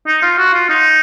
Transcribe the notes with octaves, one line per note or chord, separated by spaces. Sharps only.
D#4
F4
F#4
F4
D#4